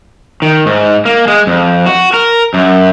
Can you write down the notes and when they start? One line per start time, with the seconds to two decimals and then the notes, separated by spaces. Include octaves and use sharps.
0.42 D#3
0.66 G#2
1.05 A#3
1.28 G#3
1.47 F2
1.86 F#4
2.13 A#4
2.54 F#2